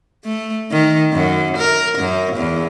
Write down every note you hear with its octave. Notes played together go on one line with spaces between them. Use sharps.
A3
D#3
F#2
A#4
F#2
E2